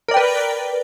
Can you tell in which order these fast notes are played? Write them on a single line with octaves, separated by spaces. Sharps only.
A#4 D5 G5 B4